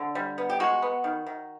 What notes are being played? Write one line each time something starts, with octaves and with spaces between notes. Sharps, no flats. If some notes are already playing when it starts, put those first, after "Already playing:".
Already playing: D3
G3
B3
G4
G#3 F#4
B3
D#3
D#3